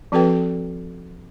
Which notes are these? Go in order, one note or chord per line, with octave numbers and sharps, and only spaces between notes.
F3 C4 F#4 A4 B4 G5